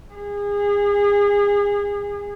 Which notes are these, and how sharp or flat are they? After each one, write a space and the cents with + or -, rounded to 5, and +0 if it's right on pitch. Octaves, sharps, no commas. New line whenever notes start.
G#4 -30